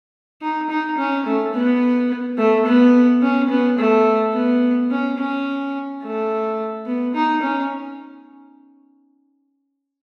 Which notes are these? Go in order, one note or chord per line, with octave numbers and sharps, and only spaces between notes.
D#4
D#4
C#4
A3
B3
A3
B3
C#4
B3
A3
B3
C#4
C#4
A3
B3
D#4
C#4